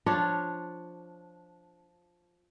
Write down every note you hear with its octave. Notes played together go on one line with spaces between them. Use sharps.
F3 D4 F4 C#5